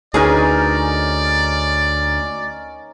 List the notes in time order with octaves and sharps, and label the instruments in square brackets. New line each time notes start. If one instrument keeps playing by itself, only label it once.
[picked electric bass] D2 [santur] C#4 D#4 A#4 [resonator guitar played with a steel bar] G#4 B4 G#5 [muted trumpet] D5